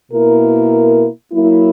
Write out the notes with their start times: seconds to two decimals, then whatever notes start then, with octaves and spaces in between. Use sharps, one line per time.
0.12 B2 A#3 E4 A#4
1.33 F#3 A#3 E4